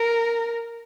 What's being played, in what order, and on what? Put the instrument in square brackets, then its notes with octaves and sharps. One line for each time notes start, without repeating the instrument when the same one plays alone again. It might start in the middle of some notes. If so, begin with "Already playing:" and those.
Already playing: [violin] A#4